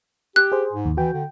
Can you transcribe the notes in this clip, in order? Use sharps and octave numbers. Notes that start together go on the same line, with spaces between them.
G4 F#6
G#4 C5
G#2
D#2
E3 F#4 G5
D3